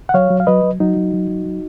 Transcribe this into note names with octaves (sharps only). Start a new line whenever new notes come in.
F#5
F#3 C#5 F5
F#3
F5
F#3 B4 D#5
F#3
F#3 D#4 F#4
F#3
F#3
F#3
F#3